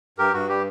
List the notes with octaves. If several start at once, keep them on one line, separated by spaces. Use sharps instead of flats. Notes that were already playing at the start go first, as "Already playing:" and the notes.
G2 G4 A#4
G2 F#4
G3 G4